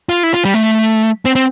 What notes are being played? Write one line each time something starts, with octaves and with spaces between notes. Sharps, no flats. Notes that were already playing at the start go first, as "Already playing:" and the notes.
F4
E4
F4
G3
A3
C4
C4